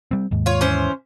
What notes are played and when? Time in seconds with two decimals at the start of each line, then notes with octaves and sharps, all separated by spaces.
0.11 G3 C4
0.31 D#2 G#2
0.46 F4 C#5
0.61 E3 C#4 C5